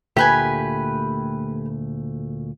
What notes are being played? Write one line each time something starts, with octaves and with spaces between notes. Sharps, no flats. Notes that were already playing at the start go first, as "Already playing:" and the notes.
D2 A#2 A3 G4 B4 G#5